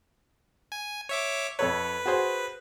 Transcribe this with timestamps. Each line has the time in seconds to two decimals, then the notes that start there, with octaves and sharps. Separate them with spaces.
0.72 G#5
1.09 C#5 E5 D6
1.59 F2 A4 B4 C#5
2.06 F#4 G#4 C5